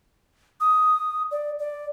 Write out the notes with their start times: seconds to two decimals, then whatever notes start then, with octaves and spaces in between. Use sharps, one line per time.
0.60 D#6
1.31 D5
1.59 D5